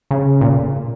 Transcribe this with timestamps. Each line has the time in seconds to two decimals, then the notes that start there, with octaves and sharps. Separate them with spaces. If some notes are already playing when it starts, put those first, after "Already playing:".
0.11 C#3
0.41 A#2